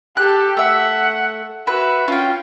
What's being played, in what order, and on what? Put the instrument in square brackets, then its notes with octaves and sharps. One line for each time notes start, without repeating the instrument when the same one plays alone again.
[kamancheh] G4 A4 [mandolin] F#6
[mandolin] A3 E5 [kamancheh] F#5
[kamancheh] F#4 E5 [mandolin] B4 B5
[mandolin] C#4 G5 [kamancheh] F4